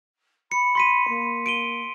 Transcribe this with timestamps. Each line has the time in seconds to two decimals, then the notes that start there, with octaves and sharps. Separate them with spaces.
0.52 B5 C#7
0.75 C6 B6 D#7
1.08 A#3
1.46 D7 D#7 G7